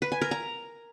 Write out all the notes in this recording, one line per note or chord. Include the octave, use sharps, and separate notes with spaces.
B4
G#5
A#4
A#5